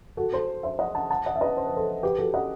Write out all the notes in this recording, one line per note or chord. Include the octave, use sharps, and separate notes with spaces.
F#4 A4
A4 C5
C5 E5
D#5 F#5
F#5 A5
F#5 A5
D#5 F#5
E5
B4 D#5
C5
B4
A4 C5
G4 B4
F#4 A4
D#5 F#5